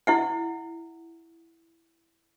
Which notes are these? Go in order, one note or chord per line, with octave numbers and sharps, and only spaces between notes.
E4 E5 F#5